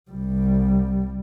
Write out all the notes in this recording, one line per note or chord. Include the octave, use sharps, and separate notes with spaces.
C2 G3